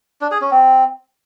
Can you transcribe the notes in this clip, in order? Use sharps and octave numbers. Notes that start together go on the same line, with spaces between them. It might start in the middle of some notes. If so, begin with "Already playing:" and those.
D4
G#4
C#4
C4